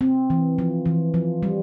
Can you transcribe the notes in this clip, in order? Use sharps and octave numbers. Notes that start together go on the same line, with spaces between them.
C4
E3
F3
E3
F3
G3